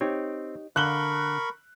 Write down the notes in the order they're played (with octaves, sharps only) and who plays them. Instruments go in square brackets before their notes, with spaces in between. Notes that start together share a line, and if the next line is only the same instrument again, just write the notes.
[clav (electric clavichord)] C4 [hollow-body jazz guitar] D#4 G4 C#5
[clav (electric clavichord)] D3 [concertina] A#4 B5 C#6 [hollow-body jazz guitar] F5 [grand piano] F#6 F#7 G7